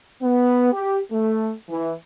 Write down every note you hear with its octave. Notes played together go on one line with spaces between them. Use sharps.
B3
G4
A3
E3